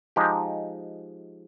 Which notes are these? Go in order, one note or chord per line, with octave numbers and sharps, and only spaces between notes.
F3 G#3 D#4 G4